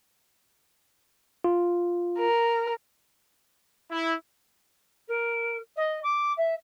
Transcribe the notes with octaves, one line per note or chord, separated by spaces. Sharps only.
F4
A#4
E4
A#4
D#5
D6
E5